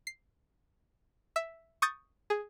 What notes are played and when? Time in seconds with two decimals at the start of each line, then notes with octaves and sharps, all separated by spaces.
0.07 C7
1.36 E5
1.82 C#6 D#6 G6 A6
2.30 G#4